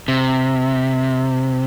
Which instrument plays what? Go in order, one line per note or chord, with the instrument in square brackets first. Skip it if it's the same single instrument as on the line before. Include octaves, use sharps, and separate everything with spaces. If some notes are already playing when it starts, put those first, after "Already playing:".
[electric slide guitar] C3